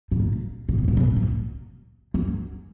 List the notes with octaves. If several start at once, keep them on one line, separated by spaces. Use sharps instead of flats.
A2
A#2
A#2
B2
A#2
B2
A#2
F#2